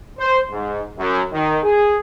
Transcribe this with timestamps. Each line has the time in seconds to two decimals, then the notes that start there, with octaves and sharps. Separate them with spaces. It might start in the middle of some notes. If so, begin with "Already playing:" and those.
0.19 C5
0.51 G#2
0.99 F#2
1.33 D#3
1.64 G#4